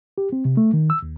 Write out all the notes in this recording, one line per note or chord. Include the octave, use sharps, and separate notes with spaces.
G4
C4
C3
A3
D#3
E6
D#2